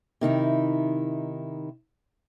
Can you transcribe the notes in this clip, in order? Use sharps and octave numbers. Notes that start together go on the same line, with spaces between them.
C3 D#3 D#4 E4